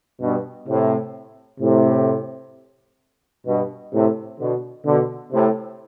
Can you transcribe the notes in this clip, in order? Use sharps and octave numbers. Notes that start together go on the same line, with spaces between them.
G2 B2
A2 C3
A2 C3
G2 B2
A2 C3
B2 D3
B2 D3
A2 C3